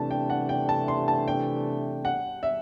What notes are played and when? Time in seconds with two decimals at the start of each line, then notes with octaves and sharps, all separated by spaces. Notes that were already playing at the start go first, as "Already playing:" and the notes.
Already playing: C3 E3 A3 D4 A5
0.11 G5
0.30 F#5
0.49 G5
0.69 A5
0.88 C6
1.08 A5
1.28 G5
2.05 F#5
2.43 E5